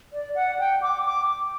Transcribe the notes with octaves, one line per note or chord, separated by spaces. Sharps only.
D5
F#5
G5
D6
D6